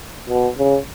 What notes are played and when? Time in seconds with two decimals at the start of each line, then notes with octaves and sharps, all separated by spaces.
0.29 B2
0.58 C#3